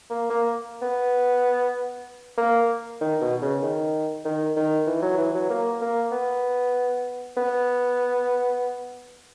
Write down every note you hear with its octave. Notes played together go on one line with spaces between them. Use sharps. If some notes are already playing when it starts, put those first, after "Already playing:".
A#3
A#3
B3
A#3
D#3
B2
C#3
D#3
D#3
D#3
E3
F#3
E3
F#3
A#3
A#3
B3
B3